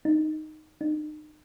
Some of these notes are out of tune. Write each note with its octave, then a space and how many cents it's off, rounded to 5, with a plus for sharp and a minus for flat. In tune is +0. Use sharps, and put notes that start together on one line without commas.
D#4 -5
D#4 -35